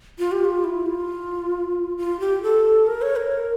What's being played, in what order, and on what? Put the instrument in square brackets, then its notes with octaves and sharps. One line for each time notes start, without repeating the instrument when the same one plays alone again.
[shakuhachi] F4
G4
F4
E4
F4
F4
G4
A4
A#4
C#5
A#4